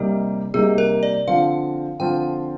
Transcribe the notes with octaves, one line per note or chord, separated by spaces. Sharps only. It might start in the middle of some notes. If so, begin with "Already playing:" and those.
Already playing: C3 G3 A#3 D#4 G4
C3 G3 A#3 D#4 G#4
A#4
D5
D3 F3 C4 F4 F5
D3 F3 C4 F4 G5